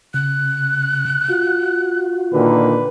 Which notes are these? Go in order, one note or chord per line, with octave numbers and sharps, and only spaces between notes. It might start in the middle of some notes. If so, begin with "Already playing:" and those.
C#3 F#6
F4 F#4
A#2 D3 D#3 B4